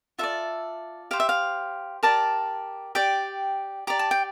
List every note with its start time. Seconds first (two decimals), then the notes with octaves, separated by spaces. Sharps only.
0.18 F4 A4 D5 E5
1.11 G4 C5 F5
1.20 E5
1.29 F5
2.03 G4 A#4 D5 A5
2.95 G4 D5 G5
3.87 G4 D5 A#5
3.99 A5
4.11 G5